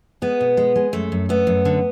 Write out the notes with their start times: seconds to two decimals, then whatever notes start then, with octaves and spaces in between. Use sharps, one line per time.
0.22 G#3 B3
0.41 B2
0.57 G#3
0.76 G#3
0.93 F#2 A3
1.12 F#2
1.29 A3 B3
1.47 F#2
1.65 D3